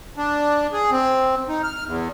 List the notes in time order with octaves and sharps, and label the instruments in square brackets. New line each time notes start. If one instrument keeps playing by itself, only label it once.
[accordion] D4
G#4
C4
D#4
F6
E2